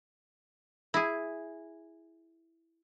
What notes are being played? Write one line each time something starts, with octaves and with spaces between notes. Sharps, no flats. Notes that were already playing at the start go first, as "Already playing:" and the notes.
E4 G#4